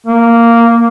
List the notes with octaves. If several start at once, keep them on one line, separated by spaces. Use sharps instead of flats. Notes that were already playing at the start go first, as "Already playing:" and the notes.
A#3